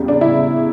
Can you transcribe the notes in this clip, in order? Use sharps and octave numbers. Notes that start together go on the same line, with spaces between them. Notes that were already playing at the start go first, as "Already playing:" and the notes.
Already playing: E2 C#3 G3
D4
E4